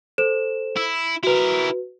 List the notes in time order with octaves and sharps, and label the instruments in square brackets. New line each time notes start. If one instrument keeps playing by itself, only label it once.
[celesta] A4 C5 E7
[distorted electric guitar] E4
[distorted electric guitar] E4 A#4 [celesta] F#4 B4